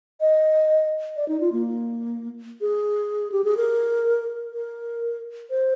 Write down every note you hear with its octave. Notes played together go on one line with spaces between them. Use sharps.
D#5
D5
D#4
F4
A#3
G#4
G4
G#4
A#4
A#4
C5